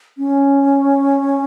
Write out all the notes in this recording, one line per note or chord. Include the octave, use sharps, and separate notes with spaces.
C#4